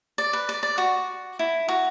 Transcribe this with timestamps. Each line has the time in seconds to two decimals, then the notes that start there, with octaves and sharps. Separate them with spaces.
0.18 D5
0.33 B4
0.49 D5
0.63 D5
0.78 F#4
1.39 E4
1.69 F#4